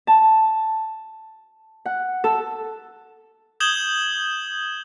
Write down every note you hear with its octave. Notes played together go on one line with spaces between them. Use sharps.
A5
F#5
A4
D#6 G6 G#6 E7 F#7 G7